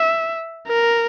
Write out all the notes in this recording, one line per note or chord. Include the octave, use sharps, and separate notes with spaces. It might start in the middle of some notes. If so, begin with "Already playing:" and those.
Already playing: E5
A#4